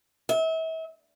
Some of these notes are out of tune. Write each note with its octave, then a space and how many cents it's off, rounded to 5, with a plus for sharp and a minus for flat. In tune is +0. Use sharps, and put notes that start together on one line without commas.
E5 -35